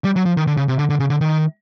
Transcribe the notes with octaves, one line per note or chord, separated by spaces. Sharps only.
G3
F#3
F3
D#3
D3
C#3
C3
D3
D3
C#3
D3
D#3